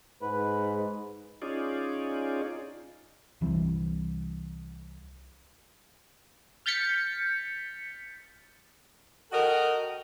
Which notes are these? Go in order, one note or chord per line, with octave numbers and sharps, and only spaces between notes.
G#2 B4
C#4 D#4 F4 G#4 D5
C2 E3 G3 C4
F6 G6 A6 B6 C#7
F#4 A4 A#4 D#5 G5